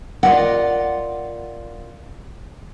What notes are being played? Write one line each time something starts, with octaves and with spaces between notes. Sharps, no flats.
F4 F#4 A#4 D5 D#5 F#5